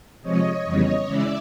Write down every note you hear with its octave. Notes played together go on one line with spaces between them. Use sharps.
C3 F3 G#3 C#5 D#5
F2 C#3 E3 G3 B3
C#3 E3 G#3 C#4 E4 D5 E5